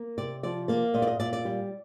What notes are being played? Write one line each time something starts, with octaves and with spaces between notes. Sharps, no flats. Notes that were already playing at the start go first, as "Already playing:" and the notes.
Already playing: A#3
C3 D5
F3 D5
A#3 D5
A#2 D#5
D5
D#5
A#2 D5
D5
G3